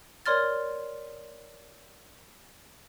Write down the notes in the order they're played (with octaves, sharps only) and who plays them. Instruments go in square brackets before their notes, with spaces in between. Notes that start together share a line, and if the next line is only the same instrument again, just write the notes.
[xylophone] A#4 C#5 D5 C6 F6 A6